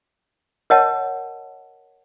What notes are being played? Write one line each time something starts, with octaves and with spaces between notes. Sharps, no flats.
A#4 C#5 D#5 F#5 A5